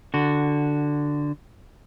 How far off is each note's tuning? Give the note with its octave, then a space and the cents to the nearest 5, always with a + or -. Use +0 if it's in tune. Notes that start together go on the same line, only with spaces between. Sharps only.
D3 +0 F#4 +0